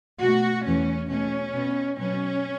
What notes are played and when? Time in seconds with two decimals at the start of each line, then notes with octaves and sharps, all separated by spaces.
0.21 B2 A3 F#4
0.66 E2 E3 A3 C#4
1.09 B2 A3 C#4
1.54 B2 B3
1.98 B2 F#3 B3 C#4